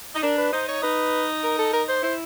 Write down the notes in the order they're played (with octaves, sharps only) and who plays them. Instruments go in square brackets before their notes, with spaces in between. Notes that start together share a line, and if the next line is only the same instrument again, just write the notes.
[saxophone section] D#4
[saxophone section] D4 [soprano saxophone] A#4
[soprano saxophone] B4
[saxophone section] D#4 [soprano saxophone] C5
[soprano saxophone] C#5
[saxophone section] D#4 [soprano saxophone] B4
[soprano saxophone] A#4
A4
A#4
C5
[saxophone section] E4 [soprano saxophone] C5